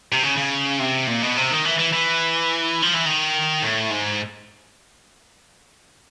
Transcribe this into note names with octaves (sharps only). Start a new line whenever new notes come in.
C3
C#3
C#3
C3
A#2
B2
C3
D#3
E3
E3
E3
F3
E3
D#3
A2
G#2